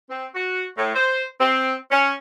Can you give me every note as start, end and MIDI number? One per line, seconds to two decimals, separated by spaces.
0.09 0.25 60
0.35 0.64 66
0.77 0.91 45
0.94 1.24 72
1.38 1.73 60
1.91 2.12 61